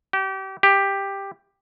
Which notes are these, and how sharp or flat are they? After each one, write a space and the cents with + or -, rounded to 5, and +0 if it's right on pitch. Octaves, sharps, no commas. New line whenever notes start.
G4 -30
G4 +10